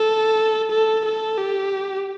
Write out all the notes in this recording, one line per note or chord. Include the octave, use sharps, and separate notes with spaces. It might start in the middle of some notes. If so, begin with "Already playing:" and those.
Already playing: A4
A4
A4
G4